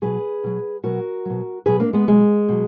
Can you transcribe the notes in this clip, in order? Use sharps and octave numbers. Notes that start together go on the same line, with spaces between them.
B2 F#3 G#4 B4
B2 F#3
B2 F#3 F#4 A#4
B2 F#3
B2 F#3 G#4 B4
A#3 D4
G#3 B3
B2 F#3 G#3
B2 F#3